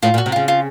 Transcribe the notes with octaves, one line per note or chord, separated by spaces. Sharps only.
A2 F4
A#2
F#4
C3
C#3 F4
F4